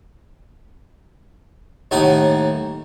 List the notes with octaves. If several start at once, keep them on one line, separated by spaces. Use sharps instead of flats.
D#2 A2 D#4 F#5 G#5 A5